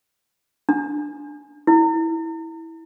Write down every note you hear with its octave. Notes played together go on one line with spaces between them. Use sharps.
D4
E4